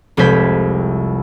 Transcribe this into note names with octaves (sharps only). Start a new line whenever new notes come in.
F1 C2 G#3 C5 G#6 B6